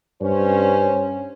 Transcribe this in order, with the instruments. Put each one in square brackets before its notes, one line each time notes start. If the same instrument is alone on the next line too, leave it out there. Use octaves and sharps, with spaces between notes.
[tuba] G2 [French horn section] C#4 C5